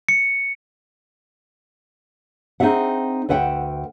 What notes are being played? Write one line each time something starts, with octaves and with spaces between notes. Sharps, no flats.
C#7
C4 D#4 F4 G#4 E5 F#5
D2 B4 E5 F#5 G5